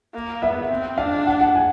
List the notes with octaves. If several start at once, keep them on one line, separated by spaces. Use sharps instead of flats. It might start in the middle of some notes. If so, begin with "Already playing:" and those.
A#3
B3 E5
C4
D4 F5
F#5
F#5
G#5